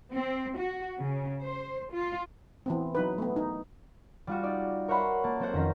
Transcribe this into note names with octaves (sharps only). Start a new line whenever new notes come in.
C4
F#4
C#3
C5
F4
E3 B3 C4
F#3 D#4 B4
A3 B3
D#4
G3 F4 F#4
D#4 D5
A#4 C#5 E5 F#5 B5 C6
A#3 A5
F#3 C4 A4 A#4 C5 F#5
F2 D#3 C#4 A#5 A#6 B6